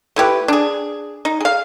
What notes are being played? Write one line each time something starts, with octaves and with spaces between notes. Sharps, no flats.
A3 E4 G4 B4
D4 G#4
D#4
G#4 F5